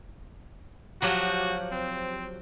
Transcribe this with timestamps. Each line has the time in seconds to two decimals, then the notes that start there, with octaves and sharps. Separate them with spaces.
1.02 F3 F#3 F#4 G4
1.72 C4